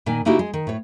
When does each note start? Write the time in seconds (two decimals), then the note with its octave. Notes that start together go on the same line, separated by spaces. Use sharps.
0.06 A#2 D#3 G#5
0.25 C#3 A#3 D#4 E4 F#4 G4
0.39 G#3
0.54 D#3
0.67 A2 C#5